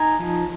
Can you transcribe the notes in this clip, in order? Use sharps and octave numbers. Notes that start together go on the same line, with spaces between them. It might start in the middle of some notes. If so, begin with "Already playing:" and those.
Already playing: D#4 G#5 A#5
F3